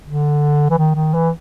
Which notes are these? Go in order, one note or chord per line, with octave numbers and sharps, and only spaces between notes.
D3
E3
D#3
D#3
E3